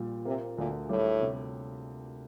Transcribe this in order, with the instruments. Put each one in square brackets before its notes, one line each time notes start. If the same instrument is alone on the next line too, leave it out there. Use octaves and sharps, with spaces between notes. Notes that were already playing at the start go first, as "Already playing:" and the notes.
Already playing: [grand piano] A#1 A#2 G3
[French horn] C3 [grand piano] A#3
[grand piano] D2 [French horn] A#2
[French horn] A2 [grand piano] G3
[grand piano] C3